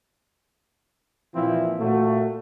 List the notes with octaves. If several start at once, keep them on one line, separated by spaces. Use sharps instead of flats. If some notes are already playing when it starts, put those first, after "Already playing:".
A#2 E3 F3 C4 E4 F4
A#2 A3 F#4